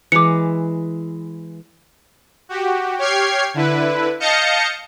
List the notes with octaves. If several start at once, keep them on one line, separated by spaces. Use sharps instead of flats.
E3 G#3 D6 C#7
F#4 G4
G4 C#5 G5 F6 G#6 C7
D3 E4 B4
D#5 F5 A5 G6 A#6 C#7